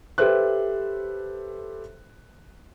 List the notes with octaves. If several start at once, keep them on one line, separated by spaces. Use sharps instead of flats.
G4 A4 B4 C5 E5 F#6